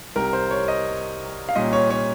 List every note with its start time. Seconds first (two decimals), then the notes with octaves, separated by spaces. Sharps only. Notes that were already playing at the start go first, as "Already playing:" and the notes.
0.16 C2 C3 G3 A#4
0.33 C5
0.51 C#5
0.68 D#5
1.49 F5
1.55 A#2 G3 A#3 C#4 D#5
1.73 C#5
1.90 C#5